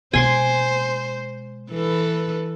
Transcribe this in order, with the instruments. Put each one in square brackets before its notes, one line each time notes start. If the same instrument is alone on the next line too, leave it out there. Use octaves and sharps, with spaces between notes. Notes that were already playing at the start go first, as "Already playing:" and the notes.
[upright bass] B2 G#3 [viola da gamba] C5 [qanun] G#5 C6 D6
[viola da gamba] E3 A4 B4